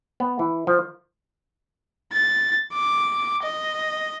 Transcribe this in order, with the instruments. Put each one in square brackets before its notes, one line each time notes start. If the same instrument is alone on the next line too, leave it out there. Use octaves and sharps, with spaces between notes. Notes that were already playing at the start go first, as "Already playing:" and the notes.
[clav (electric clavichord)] B3
E3
F3
[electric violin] A6
D6
D#5